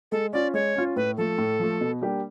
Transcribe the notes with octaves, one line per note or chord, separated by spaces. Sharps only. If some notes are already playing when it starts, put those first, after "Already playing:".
G#3 A4
C#4 F4 D5
G#3 C#5
C#4 F4
A2 B4
F3 A3 A4
A2
F3 A3
B2
G3 A#3 D4 G4